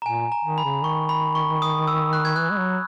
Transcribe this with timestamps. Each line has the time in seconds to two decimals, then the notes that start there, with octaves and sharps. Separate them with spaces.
0.02 A#5
0.06 A#2 G#5
0.32 A#5
0.44 D#3
0.58 B5
0.64 C#3
0.83 D#3 C#6
1.09 B5
1.35 C#6
1.62 D#6
1.87 E6
2.13 F#6
2.25 G#6
2.36 E3 F#6
2.51 G#3
2.59 F#3